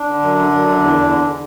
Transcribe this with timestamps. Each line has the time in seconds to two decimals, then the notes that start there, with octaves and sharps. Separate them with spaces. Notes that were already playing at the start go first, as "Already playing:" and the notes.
Already playing: D4
0.09 D3
0.22 F#2
0.37 D3
0.52 F#2
0.68 D3
0.82 E2
0.96 E2
1.12 D3
1.26 D3